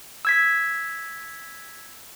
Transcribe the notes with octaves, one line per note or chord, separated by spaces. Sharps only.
E6 G#6 B6